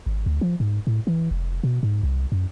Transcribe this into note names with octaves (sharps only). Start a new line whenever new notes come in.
G#1
D2
F3
G#2
A2
E3
F1
B2
G#2
C2
F#2